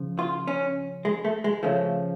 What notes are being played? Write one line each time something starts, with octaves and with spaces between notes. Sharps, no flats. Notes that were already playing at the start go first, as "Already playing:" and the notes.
Already playing: C#3 F3
F4
C#4
G#3
A3
G#3
C#3 F3 A3